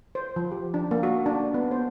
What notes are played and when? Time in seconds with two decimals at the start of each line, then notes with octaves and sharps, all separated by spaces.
0.15 C5
0.36 F3
0.52 G4
0.74 D4
0.91 A#3
1.03 F#4
1.26 D4
1.54 B3
1.71 C5